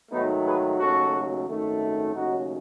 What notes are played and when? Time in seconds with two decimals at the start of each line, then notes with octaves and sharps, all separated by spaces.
0.11 G#2 D#3 F#3 A3 B3 D#4
0.45 G#4 B4
0.79 D#2 C#3 F#3 A3 F#4 A4
1.46 G#1 F#2 D#3 A3
2.14 D#2 C#3 F#3 A3 D#4 F#4